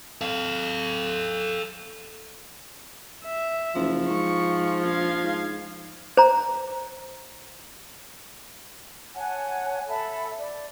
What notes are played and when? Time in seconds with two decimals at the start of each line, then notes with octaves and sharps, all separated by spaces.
0.21 A4 F5
3.25 E5
3.75 F#1 F3
4.09 G#2 C#6
4.85 A#1 F5 G#6
5.23 G#2
6.17 C5 A#5
9.16 C#5 F#5 G#5 A5
9.87 A4 E5 A5 B5
10.38 D5